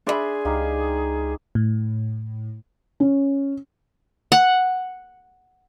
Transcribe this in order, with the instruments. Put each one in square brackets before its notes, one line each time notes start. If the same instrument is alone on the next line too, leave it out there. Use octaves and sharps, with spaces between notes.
[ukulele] D4 D#5 B5 [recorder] G#4 [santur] B4 E5 C6
[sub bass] C#2 [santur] D#4 G4 F5
[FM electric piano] A2
[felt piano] C#4
[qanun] F#5